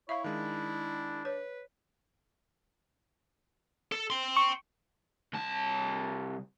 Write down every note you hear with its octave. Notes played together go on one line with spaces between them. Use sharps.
E4 C#5 E5 F5 B5
D#3 G#3 D4
B4 C#5
A4
G5 C6
C#6
C2 A5